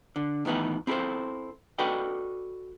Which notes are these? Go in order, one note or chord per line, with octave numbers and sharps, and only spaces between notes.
D3
A2 D#3 E3 B3 D#4
C4 E4 G4 A4 C5
F#4 A4 B4 D5 D#5 G5